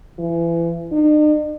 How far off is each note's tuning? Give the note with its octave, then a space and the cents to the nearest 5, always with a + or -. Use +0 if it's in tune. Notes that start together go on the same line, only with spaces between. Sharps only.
E3 +30
D#4 -45